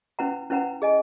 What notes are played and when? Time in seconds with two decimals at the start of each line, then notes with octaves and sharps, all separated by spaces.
0.19 C#4 E4 B4 F#5 A#5
0.50 C#4 E4 B4 F#5 A#5
0.82 G#4 D#5 G#5